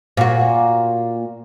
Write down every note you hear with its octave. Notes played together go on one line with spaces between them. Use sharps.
A#2 F#4